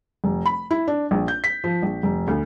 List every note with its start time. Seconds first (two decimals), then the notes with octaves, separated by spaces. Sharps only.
0.24 F1
0.46 B5
0.71 E4
0.88 D4
1.11 A#1
1.28 G6
1.44 B6
1.64 F3
1.82 A#1
2.03 F1
2.28 D2